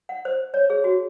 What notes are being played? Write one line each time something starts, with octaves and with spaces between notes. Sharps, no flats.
F#5
C5
C#5
G#4
F#4